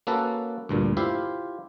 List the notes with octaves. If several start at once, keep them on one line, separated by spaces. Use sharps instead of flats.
A#3 C#4 F#4 A4 B4 A5
D2 G2 A#2
E4 F4 G4 C5 E5 F5